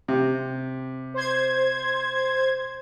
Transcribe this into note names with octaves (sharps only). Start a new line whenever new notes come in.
C3
C5 G#6